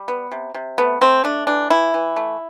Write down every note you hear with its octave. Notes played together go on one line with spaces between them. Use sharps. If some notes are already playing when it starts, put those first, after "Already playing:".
Already playing: G3
B3
C3
C3
A3 B3
A3 C4
A3 D4
E3 D4
E3 E4
E3
A3